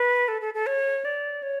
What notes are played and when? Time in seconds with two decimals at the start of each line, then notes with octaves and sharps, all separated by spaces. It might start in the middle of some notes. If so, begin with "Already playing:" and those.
Already playing: B4
0.28 A4
0.41 A4
0.54 A4
0.67 C#5
1.05 D5
1.43 C#5